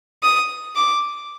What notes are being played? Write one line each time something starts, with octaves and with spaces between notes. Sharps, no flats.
D#6
D6